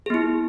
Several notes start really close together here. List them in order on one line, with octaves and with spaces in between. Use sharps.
G#4 B3 E4